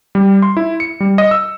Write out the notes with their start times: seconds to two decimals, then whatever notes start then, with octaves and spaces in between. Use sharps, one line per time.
0.15 G3
0.42 C6
0.57 E4
0.80 C#7
1.00 G3
1.18 D#5
1.31 E6